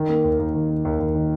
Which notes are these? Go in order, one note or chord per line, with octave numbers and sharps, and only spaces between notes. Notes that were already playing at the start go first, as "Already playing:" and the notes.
Already playing: D#3
A#3
D#2
D#2
D#3
A#3
D#2
D#2
D#3